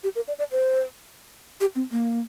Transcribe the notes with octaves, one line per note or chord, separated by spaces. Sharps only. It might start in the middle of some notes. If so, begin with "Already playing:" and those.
G4
A#4
D5
D5
C5
G4
C4
A#3